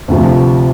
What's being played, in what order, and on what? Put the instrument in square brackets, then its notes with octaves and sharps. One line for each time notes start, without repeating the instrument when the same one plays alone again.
[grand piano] D2 C3 F3